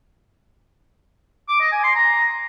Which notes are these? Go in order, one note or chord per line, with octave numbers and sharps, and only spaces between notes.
D6
D#5
G#5
C6
A#5